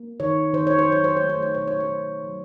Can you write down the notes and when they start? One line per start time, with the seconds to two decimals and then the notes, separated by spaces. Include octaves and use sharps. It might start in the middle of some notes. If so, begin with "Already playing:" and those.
Already playing: A#3
0.20 D#3 C#5
0.54 D#3 C5
0.67 C#5
0.79 C5
0.88 F#3 C#5
1.04 C5
1.17 C#5
1.22 A3
1.30 C5
1.43 C#5
1.54 B2 C5
1.68 C#5
1.80 C5
1.89 B2
2.24 F#3